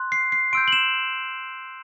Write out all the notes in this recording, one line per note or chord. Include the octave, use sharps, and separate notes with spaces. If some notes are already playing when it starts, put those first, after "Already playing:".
Already playing: C6 F#6
C7
C7
C6 E6 G6 D7
F#7
E7